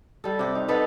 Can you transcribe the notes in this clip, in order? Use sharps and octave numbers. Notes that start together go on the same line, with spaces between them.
G3 A4
C3 G4
D#4
B3 D#4 A4 B4